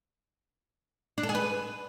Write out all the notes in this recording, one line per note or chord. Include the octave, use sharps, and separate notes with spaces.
D4
A4
G#4
B4